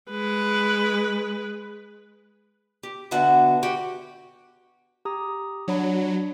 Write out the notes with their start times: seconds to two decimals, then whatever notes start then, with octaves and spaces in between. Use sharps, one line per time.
0.11 G#3 B4
2.83 G4
3.11 B2 D3 B3 F#4 E5 A5
3.63 F#4 G4
5.05 G4 A#5 D#6
5.68 F#3 D4 C#5 B5